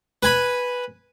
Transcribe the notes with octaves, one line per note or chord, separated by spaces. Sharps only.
B4 G#5 B5